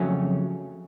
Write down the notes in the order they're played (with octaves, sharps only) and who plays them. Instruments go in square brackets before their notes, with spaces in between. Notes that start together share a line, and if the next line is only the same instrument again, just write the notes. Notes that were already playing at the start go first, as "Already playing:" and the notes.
Already playing: [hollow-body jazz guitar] F2 C#3 F#3 A3 C#4